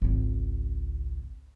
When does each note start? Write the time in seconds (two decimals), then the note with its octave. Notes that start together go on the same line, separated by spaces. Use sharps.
0.02 G#1 C#2